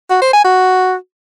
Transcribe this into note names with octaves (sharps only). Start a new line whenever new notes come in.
F#4
C5
G#5
F#4